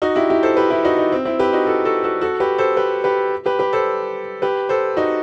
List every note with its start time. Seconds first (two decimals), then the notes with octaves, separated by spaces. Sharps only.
0.02 D#4 F#4
0.16 E4 G4
0.30 E4 G4
0.43 A4 C5
0.57 G4 B4
0.70 E4 G4
0.85 D#4 F#4
0.98 D#4
1.12 C4
1.25 C4 E4
1.39 G4 B4
1.53 D#4 F#4
1.67 F#4 A4
1.85 F#4 A4
2.04 F#4 A4
2.21 F#4 A4
2.40 G4 B4
2.58 A4 C5
2.77 G4 B4
3.04 G4 B4
3.46 G4 B4
3.59 G4 B4
3.73 A4 C5
4.42 G4 B4
4.69 A4 C5
4.97 D#4 F#4